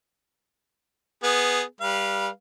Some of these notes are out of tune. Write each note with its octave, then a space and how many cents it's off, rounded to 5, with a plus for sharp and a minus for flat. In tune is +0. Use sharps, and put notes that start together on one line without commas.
B3 +0 G#4 +0
G3 +10 B4 -30 F5 -15